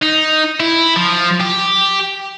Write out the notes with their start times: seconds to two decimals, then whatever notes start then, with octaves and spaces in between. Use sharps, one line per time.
0.02 D#4
0.60 E4
0.97 F3
1.40 G4